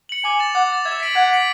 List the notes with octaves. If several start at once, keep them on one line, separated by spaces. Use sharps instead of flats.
C#7 F#7
G#5 D6
A6 E7
F#5 D6
A6 E7
E5 G#6
B6 D7 F#7
F#5 G#6
B6 D7 F#7